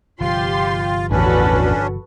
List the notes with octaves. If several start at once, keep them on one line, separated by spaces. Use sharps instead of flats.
G1 C3 F3 F4 G4 C6
A1 E2 C#4 D4 F#4 A4 B4